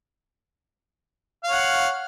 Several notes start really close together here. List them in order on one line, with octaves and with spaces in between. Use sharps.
F5 C#5 F#5